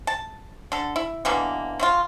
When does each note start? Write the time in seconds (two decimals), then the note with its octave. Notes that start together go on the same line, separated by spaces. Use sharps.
0.07 A5
0.72 D3 A4
0.96 E4
1.25 B2 D3 E3 A#3
1.80 F#3 C4 F4